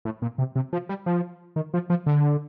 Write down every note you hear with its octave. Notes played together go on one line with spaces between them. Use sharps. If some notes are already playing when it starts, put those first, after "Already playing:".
A2
A#2
C3
C3
F3
G3
F3
D#3
F3
F3
D3